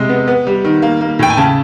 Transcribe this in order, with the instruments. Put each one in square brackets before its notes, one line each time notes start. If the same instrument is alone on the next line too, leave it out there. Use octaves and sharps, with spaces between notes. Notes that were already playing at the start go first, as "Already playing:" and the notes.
Already playing: [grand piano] C3 G#3
B3
B3
G3
D#3
A#3
A#3
A2 G5
G#5
C#3 A5